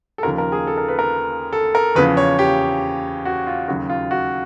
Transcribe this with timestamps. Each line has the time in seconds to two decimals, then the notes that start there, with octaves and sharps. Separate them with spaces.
0.18 A4
0.23 D#2 C#3 F3 A#4
0.38 A#4
0.52 G#4
0.67 A4
0.77 A#4
0.88 B4
0.99 A#4
1.53 A4
1.75 A#4
1.95 E2 C#3 F3 B4
2.17 C#5
2.39 G4
3.25 F#4
3.47 F4
3.68 D#2 C#3 F#3 F#4
3.90 F4
4.11 F#4